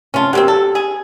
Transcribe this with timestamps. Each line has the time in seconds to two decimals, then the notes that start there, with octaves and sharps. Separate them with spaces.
0.14 C3 C#4 F4 A5
0.33 F#3 A#3 C4 G4
0.48 A4
0.75 G#4